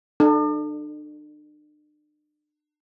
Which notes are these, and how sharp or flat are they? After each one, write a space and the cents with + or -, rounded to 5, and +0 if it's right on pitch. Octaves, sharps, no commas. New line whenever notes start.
D4 +40 A4 +0